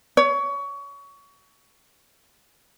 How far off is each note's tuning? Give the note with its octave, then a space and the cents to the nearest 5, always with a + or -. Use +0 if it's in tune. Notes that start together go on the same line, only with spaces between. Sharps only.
C#5 +25